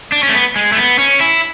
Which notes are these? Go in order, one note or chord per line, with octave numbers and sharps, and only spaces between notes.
D4
C#4
A3
B3
G#3
A3
B3
C#4
E4